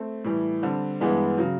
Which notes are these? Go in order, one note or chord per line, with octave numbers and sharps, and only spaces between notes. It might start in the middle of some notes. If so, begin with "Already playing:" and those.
Already playing: A3 C4
A2 E3 G3
D3 G3 C4
G2 E3 G#3 B3 D4
C#3 F#3